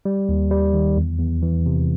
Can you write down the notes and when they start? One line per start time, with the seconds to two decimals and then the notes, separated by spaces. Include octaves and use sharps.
0.05 G3
0.29 D#2
0.51 G3
0.74 D#3
0.97 E2
1.20 E2
1.42 E3
1.66 C3